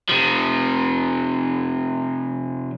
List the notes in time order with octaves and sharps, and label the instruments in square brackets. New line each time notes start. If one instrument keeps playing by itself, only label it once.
[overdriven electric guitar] C3 F3